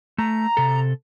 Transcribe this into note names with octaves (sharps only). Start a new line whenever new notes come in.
A3 A#5
C3 A4